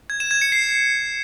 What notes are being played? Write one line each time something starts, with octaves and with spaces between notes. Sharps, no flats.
G#6
E7
G#6
C#7
C7